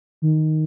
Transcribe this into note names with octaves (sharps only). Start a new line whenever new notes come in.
D#3